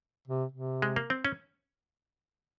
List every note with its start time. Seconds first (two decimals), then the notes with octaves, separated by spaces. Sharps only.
0.28 C3
0.52 C3
0.82 G#3
0.96 A#3
1.10 C4
1.25 C#4